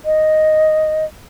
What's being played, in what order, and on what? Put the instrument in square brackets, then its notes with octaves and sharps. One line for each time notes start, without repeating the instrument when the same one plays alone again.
[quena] D#5